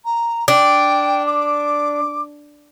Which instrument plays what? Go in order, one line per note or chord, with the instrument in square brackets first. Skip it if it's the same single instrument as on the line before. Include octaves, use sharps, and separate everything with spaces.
[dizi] A#5
[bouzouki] D4 [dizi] G5
[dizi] D6